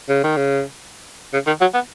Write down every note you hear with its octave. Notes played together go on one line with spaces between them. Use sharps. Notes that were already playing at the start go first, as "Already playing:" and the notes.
C#3
D#3
C#3
C#3
D#3
F#3
B3